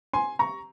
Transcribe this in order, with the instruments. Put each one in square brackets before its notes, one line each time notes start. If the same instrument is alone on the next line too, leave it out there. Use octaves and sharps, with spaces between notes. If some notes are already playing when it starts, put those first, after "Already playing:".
[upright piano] G#5 C6
A#5 C#6